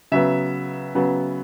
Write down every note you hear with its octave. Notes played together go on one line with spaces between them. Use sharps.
C#3 F#3 B3 E5
C#3 F#3 B3